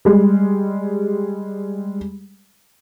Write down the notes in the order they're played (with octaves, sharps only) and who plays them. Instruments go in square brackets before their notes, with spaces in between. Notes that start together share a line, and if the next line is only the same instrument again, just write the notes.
[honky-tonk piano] G3 G#3